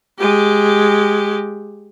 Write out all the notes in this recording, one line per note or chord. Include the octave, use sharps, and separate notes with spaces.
G#3 G4